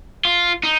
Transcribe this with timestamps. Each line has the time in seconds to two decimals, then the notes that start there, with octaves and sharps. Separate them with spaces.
0.25 F4
0.63 D#4